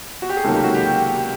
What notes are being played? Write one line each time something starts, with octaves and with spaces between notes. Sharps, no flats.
F#4
G4
G#4
C#2 C3 D#3 F#3 A#3 A4
G4
F#4
G4